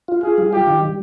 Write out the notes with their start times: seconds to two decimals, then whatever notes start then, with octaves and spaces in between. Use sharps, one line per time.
0.08 F4
0.23 F4 G#4
0.38 G3
0.53 F4 G4
0.67 D#3
0.81 G3